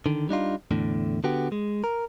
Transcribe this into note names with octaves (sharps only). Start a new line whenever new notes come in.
D3 D#3
G3 D4 D#4 F4
E2 A2 D3
D3 B3 F#4 G4
G#3
A#4